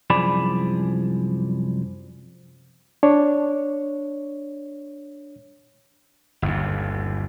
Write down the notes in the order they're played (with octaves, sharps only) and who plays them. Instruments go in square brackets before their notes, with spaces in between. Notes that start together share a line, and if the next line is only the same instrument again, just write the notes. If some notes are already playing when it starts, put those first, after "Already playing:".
[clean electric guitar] C2 F#2 F3 G#4 D5 B5
[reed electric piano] D4 C#5
[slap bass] G1 D#2